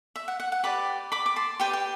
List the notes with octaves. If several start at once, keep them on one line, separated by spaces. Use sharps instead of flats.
E5
F#5
F#5
F#5
G4 B4 D5 B5 D6
B5 D6
D6
A5 C6
G4 B4 D5 G5 B5
G5